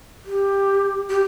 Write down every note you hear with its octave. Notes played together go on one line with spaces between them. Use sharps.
G4
G4